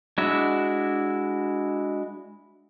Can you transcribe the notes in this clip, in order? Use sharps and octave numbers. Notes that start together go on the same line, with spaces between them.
G#3 D4 E4 F#4 E5